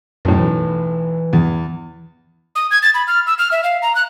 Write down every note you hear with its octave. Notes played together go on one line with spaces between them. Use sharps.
B1 F#2 A2
E3
E2
D#6
G#6
A6
B5
F6
E6
F6
E5
F5
A#5
F#6